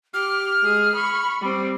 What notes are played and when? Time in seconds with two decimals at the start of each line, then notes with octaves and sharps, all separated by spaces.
0.14 G4 F6
0.62 G#3 G#4
0.95 B5 C#6
1.41 G3 C4